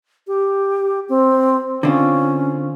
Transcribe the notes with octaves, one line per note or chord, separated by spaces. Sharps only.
G4
C4
D3 C4 C#4 F4